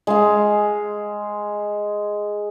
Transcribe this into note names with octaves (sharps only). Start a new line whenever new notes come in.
G#3 F5